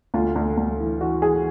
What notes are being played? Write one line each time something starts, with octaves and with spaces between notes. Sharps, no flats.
D2 F4
D2
D2
E3
E3 F#4
E3 G#4